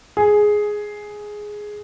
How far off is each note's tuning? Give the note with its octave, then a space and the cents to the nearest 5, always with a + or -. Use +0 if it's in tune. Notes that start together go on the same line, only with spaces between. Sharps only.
G#4 +5